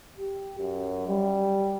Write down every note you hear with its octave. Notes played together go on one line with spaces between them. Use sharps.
G4
F#2
G3